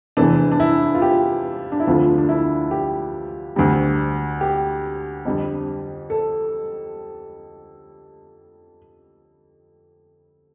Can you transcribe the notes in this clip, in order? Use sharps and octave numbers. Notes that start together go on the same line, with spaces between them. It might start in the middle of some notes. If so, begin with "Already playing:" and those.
F1 E2 E3 D4
D4
E4
F4
G4
D4
E4
D2 D3 F3 A3 F4
D4
E4
G4
D2 D3 G3
G4
F2 D3 G3
A4